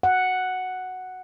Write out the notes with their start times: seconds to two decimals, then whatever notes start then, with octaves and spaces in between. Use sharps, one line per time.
0.03 F#5